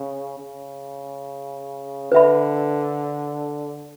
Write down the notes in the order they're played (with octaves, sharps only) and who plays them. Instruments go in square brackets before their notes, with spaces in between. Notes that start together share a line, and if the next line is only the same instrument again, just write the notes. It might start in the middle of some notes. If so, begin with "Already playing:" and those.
Already playing: [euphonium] C#3
C#3
[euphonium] D3 [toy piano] B4 E5 B5